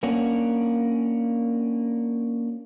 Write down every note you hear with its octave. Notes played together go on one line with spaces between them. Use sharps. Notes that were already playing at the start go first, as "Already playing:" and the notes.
A#3 C#4 D4 F#4